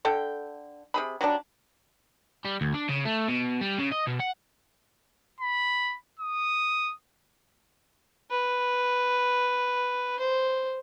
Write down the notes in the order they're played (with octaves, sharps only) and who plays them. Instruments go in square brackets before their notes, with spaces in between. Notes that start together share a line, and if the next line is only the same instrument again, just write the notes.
[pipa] D3 A4 G5
C3 G#4 B5
F#3 G3 C#4 D4
[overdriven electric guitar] G3
D2
D4
C#3
A3
B2
G3
C#3
D#5
B2
F#5
[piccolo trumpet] B5
D#6
[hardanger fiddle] B4
C5